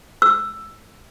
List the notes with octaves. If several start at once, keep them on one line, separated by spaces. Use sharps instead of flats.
E6